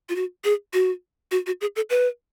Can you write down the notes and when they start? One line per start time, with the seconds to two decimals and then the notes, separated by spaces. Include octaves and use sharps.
0.09 F4
0.16 F#4
0.44 G#4
0.73 F#4
1.31 F#4
1.47 F#4
1.61 G#4
1.76 A4
1.90 B4